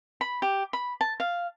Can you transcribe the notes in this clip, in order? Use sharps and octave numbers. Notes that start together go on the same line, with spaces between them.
B5
G4
B5
A5
F5